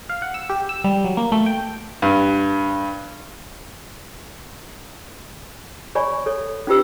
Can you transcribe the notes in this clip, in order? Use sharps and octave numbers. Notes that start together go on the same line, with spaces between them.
F5
F#5
E6
G4
E6
G3
F#3
A#3
A3
G5
G2
C#5 D5 G#5 B5 C#6
A4 C#5
C#4 D#4 F4 G4 B4 E6